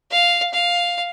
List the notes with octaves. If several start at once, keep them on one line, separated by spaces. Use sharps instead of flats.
F5
F5